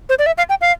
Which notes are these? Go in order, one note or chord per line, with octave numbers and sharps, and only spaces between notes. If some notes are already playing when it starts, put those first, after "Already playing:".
C5
D5
E5
F5
G5
F5